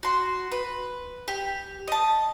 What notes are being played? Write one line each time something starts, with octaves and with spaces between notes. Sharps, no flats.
F#4 C6
B4
G4
D#5 A5